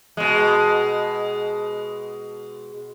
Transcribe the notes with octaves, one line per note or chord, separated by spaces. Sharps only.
B2 G#3